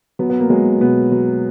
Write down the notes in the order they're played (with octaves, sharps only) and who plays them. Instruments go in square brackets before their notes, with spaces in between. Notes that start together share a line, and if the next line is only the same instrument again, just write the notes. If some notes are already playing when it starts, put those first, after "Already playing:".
[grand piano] F#3 B3
B3
A#3
F#3 G#3
B2 B3
F#3